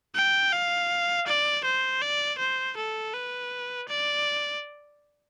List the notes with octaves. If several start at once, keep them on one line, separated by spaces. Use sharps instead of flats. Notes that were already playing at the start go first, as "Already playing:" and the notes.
G5
F5
D5
C5
D5
C5
A4
B4
D5